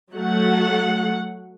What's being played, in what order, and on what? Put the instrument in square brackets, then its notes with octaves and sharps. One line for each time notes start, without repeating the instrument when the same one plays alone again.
[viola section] F#3 A3 F#5